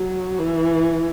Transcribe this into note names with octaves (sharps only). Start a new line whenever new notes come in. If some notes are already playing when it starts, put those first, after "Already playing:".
Already playing: F#3
E3